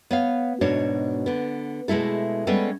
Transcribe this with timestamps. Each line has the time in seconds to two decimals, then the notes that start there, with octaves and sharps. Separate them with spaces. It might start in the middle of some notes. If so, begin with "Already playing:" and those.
0.11 B3 C#5 F5
0.61 G#2 B2 D4 C#5
1.26 D3 B3
1.88 B2 G#3 A3 E4 A4
2.47 G3 G#3 B3 C#4 A4